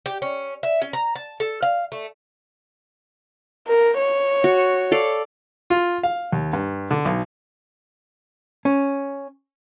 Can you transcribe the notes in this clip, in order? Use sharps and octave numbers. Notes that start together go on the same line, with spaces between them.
G4
C#4
E5
C#4
A#5
A5
A4
F5
A3
A#4
C#5
F#4
A4 D5 F5
F4
F5
D#2
G2
D3
B1
C#4